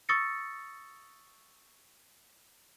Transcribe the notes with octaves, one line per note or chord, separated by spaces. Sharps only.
C#6 D#6 E6 A6 A#6 C#7